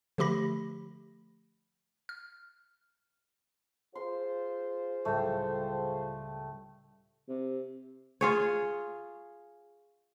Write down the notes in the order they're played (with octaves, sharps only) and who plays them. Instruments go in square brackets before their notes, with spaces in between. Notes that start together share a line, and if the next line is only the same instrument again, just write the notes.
[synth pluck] D3 F3 A3 G4 B5 A#6
F6
[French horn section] F4 G#4 C5 [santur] C6
[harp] C#2 A2 G3 [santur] A3 G5
[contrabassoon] C3
[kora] F4 G#4 C#5